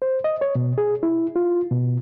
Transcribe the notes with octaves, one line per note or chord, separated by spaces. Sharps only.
C5
D#5
C#5
B2
G#4
E4
F4
B2